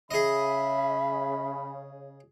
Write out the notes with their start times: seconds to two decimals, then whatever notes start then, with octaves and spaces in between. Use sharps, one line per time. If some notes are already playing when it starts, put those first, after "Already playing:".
0.11 C#3 G#4 D#5 E5 B5